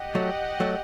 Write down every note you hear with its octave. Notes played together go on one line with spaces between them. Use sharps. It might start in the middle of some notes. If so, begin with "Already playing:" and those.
Already playing: G4 D#5 F#5
F#3 A3
F#3 A3